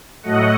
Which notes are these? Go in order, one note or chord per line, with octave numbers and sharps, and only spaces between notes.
A2 F#3 A3 D#5 F#5